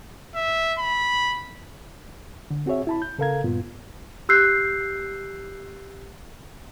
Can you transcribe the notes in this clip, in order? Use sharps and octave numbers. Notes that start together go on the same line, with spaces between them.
E5
B5
D3
C4 F#4 G#4 C#5 E5
E4 A5 B5
G6
C#3 A4 A#4 F5 A#5 G#6
G2 A#2 B3 F4
G4 E6 F#6 G6 C7